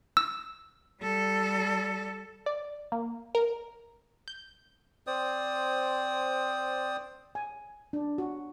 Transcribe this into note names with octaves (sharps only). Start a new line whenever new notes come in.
E6
G3 A4
D5
A#3
A#4
G6
C4 C5 D5 D#6
G#5
D4
F#4